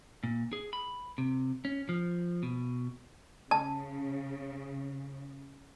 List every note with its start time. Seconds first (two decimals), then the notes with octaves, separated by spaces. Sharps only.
0.24 A#2
0.53 G#4
0.73 B5
1.18 C3
1.65 C#4
1.89 F3
2.43 B2
3.51 C#3 A5